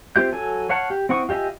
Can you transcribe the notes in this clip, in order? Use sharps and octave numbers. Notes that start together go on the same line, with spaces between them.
C4 F4 G4 E5 G6
F#3 A4 G#5
C#5 F5 F#5 A5
G4
C4 E4 F#5 C#6 D#6
F4 G4 D#5 E5 G#5